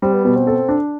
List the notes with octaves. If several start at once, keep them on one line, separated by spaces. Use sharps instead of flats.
G3 C4
B3
B2 B3
C4
A4
D4